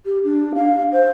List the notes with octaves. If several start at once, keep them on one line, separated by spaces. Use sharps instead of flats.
G4
D4
F5
C5